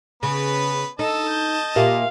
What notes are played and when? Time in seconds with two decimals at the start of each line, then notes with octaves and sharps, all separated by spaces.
0.23 C#3 B3 B4
0.99 D#4 A4 D#5 A5 E6
1.29 G6
1.76 A#2 G4 A#4 E5 F5